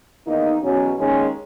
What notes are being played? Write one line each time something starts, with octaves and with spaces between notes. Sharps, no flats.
E2 D#3 A#3 D#4
E2 B2 F#3 C#4
D#2 D#3 G#3 C#4